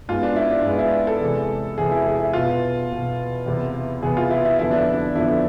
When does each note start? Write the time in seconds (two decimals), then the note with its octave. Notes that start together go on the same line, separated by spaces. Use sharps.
0.09 G#2 G#3 B3 F4
0.23 D4
0.36 E4
0.51 D4
0.65 G#2 G#3 B3
0.79 E4
1.07 A4
1.20 E2 C3 G#3
1.78 E2 C3 G#3 G#4
1.92 E4
2.06 G#4
2.20 E4
2.33 B2 B3 F4
2.91 B2 B3
3.46 E2 C3 E3 B3
4.03 E2 C3 E3 B3 G#4
4.17 F4
4.31 E4
4.45 E4
4.59 F2 D3 F3 B3 E4
4.71 D4
4.93 D4
5.15 F2 D3 F3 B3 E4